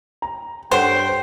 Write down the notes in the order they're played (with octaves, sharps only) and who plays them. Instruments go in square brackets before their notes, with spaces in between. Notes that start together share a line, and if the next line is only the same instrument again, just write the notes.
[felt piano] A#5
[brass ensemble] G2 G5 [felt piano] A4 C#5 F#5 [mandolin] C5